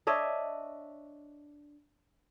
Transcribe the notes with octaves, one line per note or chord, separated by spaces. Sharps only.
D4 C#5 D#5 E5